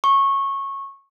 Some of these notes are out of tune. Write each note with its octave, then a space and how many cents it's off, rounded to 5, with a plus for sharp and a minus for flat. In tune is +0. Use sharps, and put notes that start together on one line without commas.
C#6 -15